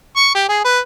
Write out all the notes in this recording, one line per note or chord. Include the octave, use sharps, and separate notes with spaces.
C#6
G4
G#4
B4